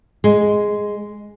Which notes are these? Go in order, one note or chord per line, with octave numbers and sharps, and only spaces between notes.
G#3